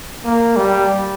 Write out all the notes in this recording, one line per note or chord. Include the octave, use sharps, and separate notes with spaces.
A#3
G3